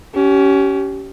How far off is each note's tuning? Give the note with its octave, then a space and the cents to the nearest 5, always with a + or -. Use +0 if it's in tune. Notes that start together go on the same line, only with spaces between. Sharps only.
C#4 +15 G4 -30